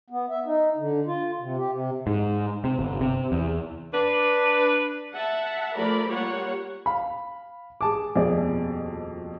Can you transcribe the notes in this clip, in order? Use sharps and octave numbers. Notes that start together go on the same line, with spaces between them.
B3
E5
D#4
D3
F4
C3
G4
C3
G#2
C3
G1
C3
E2
D4 B4
E5 F#5 A5
F3 A3 A#4 D5 B5
G3 A#3 F4 C#5 F#5
F5 B5
G#4 A5 D6
D#1 F2 B2 G#4 D5